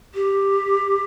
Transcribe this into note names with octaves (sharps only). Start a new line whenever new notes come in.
G4